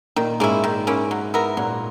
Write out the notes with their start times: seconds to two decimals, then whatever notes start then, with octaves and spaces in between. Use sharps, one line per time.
0.16 A#2 D#3 A#3
0.40 G#2 G#3 A#3 C#4 E4
0.64 D#3
0.87 A#3 C#4 E4
1.11 F#3
1.34 B3 E4 A#4
1.57 A#2 F#3 A#3